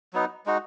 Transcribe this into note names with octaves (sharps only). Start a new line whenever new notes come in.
F#3 B3 D#4
G#3 D#4 F#4